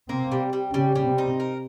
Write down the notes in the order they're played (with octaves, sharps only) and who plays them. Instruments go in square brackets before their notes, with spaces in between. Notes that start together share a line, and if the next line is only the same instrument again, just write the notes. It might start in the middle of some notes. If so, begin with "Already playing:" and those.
[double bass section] C3 C4 [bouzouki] A#3
[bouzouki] G3
G3
[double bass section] C#3 C#4 [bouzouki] G3
[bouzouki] G3
[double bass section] C3 C4
[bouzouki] D#4
A#4